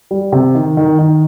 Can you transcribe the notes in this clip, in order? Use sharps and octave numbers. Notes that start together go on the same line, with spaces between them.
G3
C3
D#3
D#3
D#3